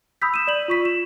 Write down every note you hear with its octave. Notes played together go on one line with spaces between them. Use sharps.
B5 D#6 E6 G6 B6
D#7 E7
D5 F#7
F4 C#6 B6
E7